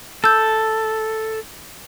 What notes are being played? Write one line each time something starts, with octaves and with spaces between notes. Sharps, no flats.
A4 E6 G6